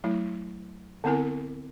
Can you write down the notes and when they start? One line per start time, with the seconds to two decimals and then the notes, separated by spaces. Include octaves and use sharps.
0.04 F#3 A3 E4
1.04 D3 B3 C4 E4 A#4 G#5